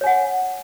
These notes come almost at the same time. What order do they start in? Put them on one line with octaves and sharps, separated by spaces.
C#5 G#5 F#5